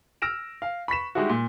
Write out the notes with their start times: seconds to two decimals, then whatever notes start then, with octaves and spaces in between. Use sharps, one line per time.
0.22 E6 F6 A#6 D7 E7
0.62 F5
0.88 B5 C#6 B6 E7
1.15 G3 G#3 D#4 E4 F#4
1.29 A#2